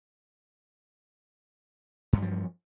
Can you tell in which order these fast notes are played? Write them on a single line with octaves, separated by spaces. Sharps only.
G2 F#3 F3